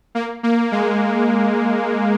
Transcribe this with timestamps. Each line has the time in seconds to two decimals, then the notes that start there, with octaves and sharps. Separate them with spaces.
0.15 A#3
0.43 A#3
0.72 G#3